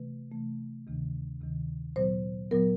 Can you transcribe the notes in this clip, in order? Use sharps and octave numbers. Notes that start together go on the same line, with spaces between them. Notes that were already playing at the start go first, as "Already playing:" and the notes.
Already playing: C3 E3 A3 B4
C3 E3 A3
D2 C3 D#3
D2 C3 D#3
A#2 F#3 B3 C5
A#2 F#3 B3 A#4